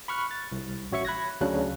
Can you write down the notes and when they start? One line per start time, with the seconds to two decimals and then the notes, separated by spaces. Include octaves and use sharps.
0.08 B5 C#6 F6 F#6
0.31 A6
0.52 C2
0.92 A1 F#4 C#5 E5 C#6 C#7
1.05 B5 F#6 G#6 A#6
1.41 D2 C#3 F#3 C#4 D4 F#6